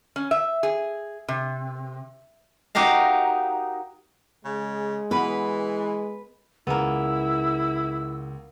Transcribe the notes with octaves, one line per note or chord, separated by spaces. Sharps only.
C#4
E5
G#4
C3
D#4 F#4 G4 A#4 F5
C#3 G#3
E3 B3 B4 B5
C#2 A#3 B3 E4 G#4 E6